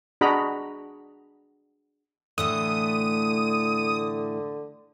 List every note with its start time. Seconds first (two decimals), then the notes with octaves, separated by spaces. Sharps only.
0.21 D4 F#4 G#4 D#5 A#5 B5
2.38 A2 D3 E3 A3 D#6